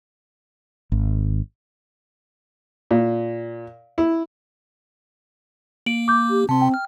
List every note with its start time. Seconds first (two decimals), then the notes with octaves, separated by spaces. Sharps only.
0.92 G#1
2.91 A#2
3.98 E4
5.86 A#3 D7 F#7
6.08 D6 G6
6.30 G4
6.49 C3 C4 A5 C6
6.61 G5
6.74 F6